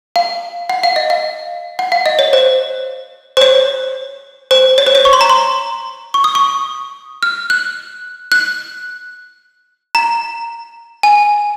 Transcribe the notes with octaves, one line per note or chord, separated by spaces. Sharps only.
F5
F#5
F5
D#5
F5
F#5
F5
D#5
C#5
C5
C5
C#5
C5
C#5
C5
C#5
C#6
C6
A#5
C6
C#6
D#6
C#6
F6
F#6
F#6
A#5
G#5